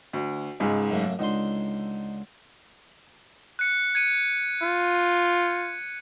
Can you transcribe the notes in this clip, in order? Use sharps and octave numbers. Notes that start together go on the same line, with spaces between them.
D2
C#2 G#2 G#4
F#2 A3 A#3
C#2 D3 D#4 C6
F#6 C#7
G#6 C#7 D#7
F4